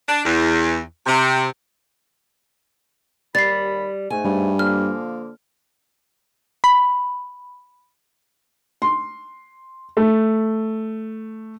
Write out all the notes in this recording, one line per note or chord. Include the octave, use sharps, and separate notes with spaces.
D4
E2
C3
D#2 G3 B5 A6 C7
G#2 A3 G#5
G2
D3 F3 A#3 F6
B5
C6
A3